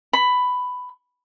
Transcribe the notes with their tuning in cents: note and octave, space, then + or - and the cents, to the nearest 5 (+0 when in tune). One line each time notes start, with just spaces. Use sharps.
B5 +10